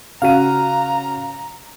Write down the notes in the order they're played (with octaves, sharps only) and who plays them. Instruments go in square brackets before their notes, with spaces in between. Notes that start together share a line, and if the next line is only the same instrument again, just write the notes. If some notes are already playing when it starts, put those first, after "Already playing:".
[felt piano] C#3 F#4 D#7 [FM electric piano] F5 [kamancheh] A#5